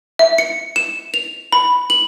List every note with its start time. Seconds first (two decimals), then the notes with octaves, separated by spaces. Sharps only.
0.19 E5
0.38 C#7
0.76 E7
1.14 F7
1.52 B5
1.90 F#7